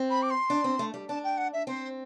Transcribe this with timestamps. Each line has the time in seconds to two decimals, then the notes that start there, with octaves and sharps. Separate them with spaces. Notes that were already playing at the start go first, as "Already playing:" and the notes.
Already playing: C4
0.10 B5
0.22 D6
0.30 C6
0.50 D4
0.64 C4
0.79 A3
0.94 G3
1.08 D4 A5
1.24 G5
1.37 F#5
1.53 E5
1.67 C4 C5